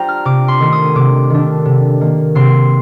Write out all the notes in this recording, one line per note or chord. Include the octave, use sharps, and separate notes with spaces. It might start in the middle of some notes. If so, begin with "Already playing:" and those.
Already playing: G3 D4 F4 C5 G5 A#5
F6
C3 D6
C6
D#3 A3 D4
D#6
C3 D6
D#3 A3 D4
C3
D#3 A#3
C3 C6